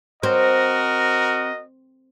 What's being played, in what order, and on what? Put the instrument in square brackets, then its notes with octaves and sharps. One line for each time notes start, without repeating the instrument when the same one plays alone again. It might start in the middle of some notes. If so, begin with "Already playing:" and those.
[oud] C4 [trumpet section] F#4 A#4 D#5